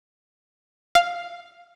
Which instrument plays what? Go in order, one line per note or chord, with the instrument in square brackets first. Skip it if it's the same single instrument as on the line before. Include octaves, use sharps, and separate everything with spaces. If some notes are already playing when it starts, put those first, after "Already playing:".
[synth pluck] F5